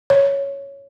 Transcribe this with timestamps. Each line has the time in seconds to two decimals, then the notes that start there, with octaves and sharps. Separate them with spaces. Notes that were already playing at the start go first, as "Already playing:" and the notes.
0.10 C#5